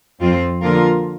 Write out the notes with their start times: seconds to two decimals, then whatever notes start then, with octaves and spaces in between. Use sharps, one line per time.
0.22 F2 F3 C4 F4
0.63 D3 F3 A#3 F4 A#4